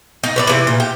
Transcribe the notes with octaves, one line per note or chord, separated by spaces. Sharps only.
D#4
B4 C#5 D5
C3 E3
A#2
G4